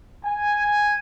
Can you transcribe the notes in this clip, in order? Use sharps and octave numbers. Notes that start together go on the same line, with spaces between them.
G#5